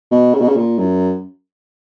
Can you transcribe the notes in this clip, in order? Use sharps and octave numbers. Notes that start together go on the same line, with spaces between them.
B2
C#3
B2
C#3
A#2
F#2